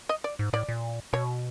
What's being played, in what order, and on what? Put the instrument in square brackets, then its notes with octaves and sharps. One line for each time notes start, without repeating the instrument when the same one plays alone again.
[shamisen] D#5
D5
[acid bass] G#2
[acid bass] A2 [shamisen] D5
[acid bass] A#2
[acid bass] B2 [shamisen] C#5